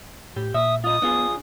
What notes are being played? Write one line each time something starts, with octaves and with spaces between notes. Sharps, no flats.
A2 G4
A#2 E5 D#6
F4 D#5 D#6
B3 D4 F4 G#4